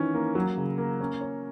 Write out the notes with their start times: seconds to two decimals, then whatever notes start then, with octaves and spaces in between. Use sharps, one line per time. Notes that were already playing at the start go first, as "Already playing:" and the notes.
Already playing: D#3 E3 C#4
0.14 A#3
0.35 F#3
0.57 C#3
0.78 A#3
1.01 C#4
1.21 C#5